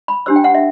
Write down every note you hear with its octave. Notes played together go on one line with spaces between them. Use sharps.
B5
D4 G4 C5 E6
G5
F#5
E5